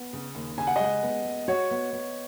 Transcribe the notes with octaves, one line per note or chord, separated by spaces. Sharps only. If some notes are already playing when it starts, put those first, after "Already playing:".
Already playing: B3
C#3
D#2
C#3 G#5
F#5
D#5
G#3 F#5
B3
G#3
F#4 C#5
B3
B3